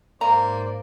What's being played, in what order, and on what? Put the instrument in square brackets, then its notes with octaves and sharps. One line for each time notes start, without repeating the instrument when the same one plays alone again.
[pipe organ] G#2 C5 D5 [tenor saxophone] A#3 [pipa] A#5